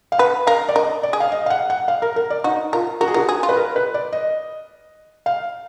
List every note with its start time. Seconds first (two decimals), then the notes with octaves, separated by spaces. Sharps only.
0.12 F5
0.19 B4 F#5
0.47 A#4 F5
0.69 D5
0.75 A#4 D#5
1.03 D5
1.13 G#4
1.20 F5
1.32 D#5
1.46 F5
1.50 F#5
1.70 F#5
1.88 F5
2.02 A#4
2.16 A#4
2.30 D5
2.44 D#4 F#4
2.72 F4 A#4
3.01 F#4 A#4
3.08 G#4
3.14 F#4 A#4
3.29 G#4
3.43 F4
3.49 B4
3.56 A#4
3.76 B4
3.94 D5
4.13 D#5
5.26 F5